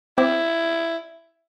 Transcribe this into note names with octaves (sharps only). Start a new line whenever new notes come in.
C4 E4 C5 D6